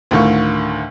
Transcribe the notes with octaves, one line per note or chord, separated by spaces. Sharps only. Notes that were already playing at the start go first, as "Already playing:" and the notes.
D2 A2 D3 D#3 F4 C#6